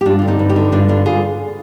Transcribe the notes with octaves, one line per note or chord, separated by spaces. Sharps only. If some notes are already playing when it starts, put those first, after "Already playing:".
G4
G2 D4 F4
D3 F4
C4 D#4
G2
D#4 G4
D3
G2 D4 F4
D3 D4 F4
F4 G#4